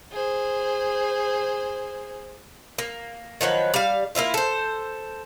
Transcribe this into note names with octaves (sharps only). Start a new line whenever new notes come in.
G#4 C5
A#3
D#3 F3 F#3 B4
G3 F5
A#3 C#4 E4 F4
A4 C5